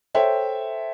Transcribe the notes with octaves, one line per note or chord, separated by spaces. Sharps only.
A4 C5 C#5 E5 G5